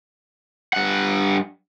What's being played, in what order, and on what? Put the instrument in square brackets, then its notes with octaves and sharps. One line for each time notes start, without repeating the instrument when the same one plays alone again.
[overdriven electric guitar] G2 F#5